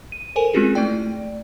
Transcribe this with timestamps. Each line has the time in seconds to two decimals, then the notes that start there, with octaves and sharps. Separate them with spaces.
0.12 D#7
0.36 A4 A#4 C5 G#5
0.54 G#3 C4 C#4 F4 F#4 G#4
0.75 A3 E4 D5 G5